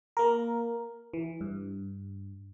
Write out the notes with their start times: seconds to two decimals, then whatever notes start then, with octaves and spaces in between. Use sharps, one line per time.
0.17 A#3 A#4
1.14 E3
1.41 G2